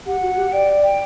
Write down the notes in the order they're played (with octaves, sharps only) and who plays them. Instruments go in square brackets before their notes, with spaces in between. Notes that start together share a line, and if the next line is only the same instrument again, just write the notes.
[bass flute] G4 [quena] F#5
[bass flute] F#4
G4
[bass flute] D5 [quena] G5
[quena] G5